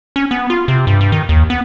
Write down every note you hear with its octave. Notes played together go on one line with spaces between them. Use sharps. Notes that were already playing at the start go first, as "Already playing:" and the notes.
C#4
B3
F4
C3
G2
G2
D#3
D#2
B3